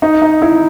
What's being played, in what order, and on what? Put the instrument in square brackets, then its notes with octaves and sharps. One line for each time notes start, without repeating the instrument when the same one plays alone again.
[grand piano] D#4
D#4
E4